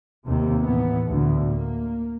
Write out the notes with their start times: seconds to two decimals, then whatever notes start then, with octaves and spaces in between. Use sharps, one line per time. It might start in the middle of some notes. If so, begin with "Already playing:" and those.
0.23 D#2 C3
0.62 A2 E3 B3
1.07 D2 A2
1.47 A#3